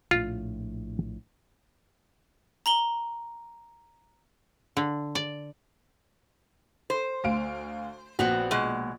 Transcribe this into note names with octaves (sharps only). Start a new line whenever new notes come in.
A#1 A2 F4
A#5 F#7 G7
D3
D5
C5
D2 F5 D7
A#1 B3 C4 F#4
B2 G#3